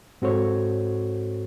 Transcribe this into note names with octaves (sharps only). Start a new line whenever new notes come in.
G#2 C4 F#4 A4 C5 C#5